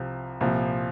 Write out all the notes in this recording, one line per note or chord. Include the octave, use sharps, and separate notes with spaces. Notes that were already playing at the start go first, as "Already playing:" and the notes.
Already playing: C2 C3 F3
C2 A#2 F3